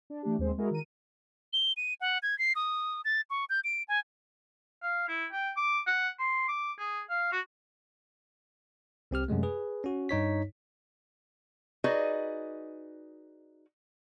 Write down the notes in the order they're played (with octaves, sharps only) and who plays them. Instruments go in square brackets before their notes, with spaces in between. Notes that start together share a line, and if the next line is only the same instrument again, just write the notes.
[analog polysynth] D4
E3 A3 D4 G4
D#2 G#3 C4 C5
G#3 E4 F#4 G#4 A#4
D#3 A#4 D#7
[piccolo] G7
D#7
F#5
G#6
C7
D#6
A6
C#6
G6
D7
G#5
[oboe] F5
E4
G5
D6
F#5
C6
D6
G#4
F5
F#4
[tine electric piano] C2 C4 G4 F6
F#2 C3 G#3 A3
G#4 B4
C#4 F#4
G2 D#4 C#5 B6
[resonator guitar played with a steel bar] D#4 F#4 G#4 B4 D5 D#5